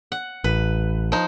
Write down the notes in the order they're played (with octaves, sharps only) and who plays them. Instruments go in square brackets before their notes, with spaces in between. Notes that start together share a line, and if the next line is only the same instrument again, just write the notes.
[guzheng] F#5
[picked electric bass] A1 [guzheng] B4
[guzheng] F3 D#4